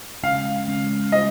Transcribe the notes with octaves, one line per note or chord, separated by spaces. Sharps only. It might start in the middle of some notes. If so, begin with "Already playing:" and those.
C#3 G#3 C#4 F5
C#3 G#3 C#4
G3 C#4 F4 C5 D#5